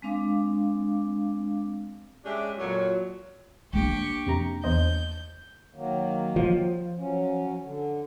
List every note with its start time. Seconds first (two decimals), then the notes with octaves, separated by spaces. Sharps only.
0.02 G#3 C4 D4 F5 D6
2.24 G#3 C#4 D4 G4 E5
2.57 F2 A#2 F#3
3.73 A#3 D4 G4 C#6
4.26 F2 C3 A#5
4.64 E2 C5 D#5 G6
5.74 D#3 F#3 A#3
6.36 F3
6.98 F#3 C#4
7.62 D3